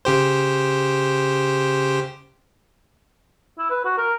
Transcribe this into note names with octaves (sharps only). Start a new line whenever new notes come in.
C#3 G4 C5
E4
B4
F#4
A#4